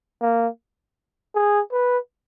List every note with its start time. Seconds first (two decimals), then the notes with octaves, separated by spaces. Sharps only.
0.21 A#3
1.35 G#4
1.72 B4